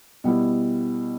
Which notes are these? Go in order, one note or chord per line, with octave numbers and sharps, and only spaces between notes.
B2 G3 B3 E4